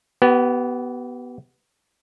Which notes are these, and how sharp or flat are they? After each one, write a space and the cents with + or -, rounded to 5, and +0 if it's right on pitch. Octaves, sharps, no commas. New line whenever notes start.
B3 +0 G4 -35 B4 +0